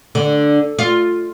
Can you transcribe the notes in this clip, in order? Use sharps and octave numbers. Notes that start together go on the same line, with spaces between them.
D3
F4